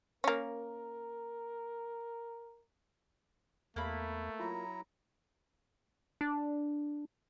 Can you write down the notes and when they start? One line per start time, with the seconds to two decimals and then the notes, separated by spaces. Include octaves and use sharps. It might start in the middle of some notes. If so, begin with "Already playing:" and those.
0.24 A#3 C#4 A#4
3.76 E2 A3 A#3 B5
4.40 F#3 E4 F4 A#5
6.21 D4